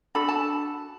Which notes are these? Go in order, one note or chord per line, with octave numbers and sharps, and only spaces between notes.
D4 F#4 A4 B5
A5